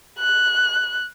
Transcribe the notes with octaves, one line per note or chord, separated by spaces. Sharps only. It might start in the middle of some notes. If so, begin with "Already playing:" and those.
F#6